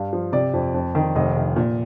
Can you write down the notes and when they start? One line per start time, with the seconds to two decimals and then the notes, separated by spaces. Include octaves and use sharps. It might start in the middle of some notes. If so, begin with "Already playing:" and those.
Already playing: G2 F5
0.13 F3
0.32 C3 D5
0.54 F2
0.74 F2
0.95 D#3
1.15 F1 D#5
1.36 F1
1.56 A#2